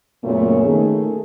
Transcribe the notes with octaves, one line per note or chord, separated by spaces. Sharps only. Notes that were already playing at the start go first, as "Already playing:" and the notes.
F#2 A#2 C#3 A3 B3 C#4
D#3 A3 G#4